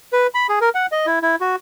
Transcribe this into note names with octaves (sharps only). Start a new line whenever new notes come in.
B4
B5
G#4
A#4
F#5
D#5
E4
E4
F#4